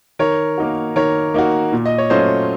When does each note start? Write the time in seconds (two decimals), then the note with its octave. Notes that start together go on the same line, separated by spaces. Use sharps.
0.19 D#3 A#4 C#5
0.58 A#3 D#4 F#4
0.96 D#3 A#4 C#5
1.34 A#3 D#4 F#4
1.72 A#2
1.86 D#5
1.98 C#5
2.10 F#3 A3 C#4 F4 C5 D#5